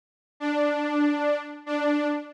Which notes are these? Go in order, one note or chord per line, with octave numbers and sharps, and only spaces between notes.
D4
D4